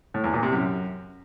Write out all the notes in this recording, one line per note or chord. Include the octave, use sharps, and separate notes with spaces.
A2
E2
A#2
C3
F#2